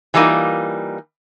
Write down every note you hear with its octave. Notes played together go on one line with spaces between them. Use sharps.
E3 F#3 G3 A#3 D#4 F4